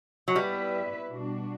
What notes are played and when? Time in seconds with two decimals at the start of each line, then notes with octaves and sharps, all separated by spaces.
0.28 F#3
0.36 G3 B3 E4 B4 E5
1.11 B2 G3 D4 F#4